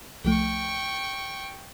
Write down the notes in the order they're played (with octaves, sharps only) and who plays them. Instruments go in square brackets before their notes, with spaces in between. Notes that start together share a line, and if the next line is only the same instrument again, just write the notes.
[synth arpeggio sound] C2 F3 A3 [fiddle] G5 C#6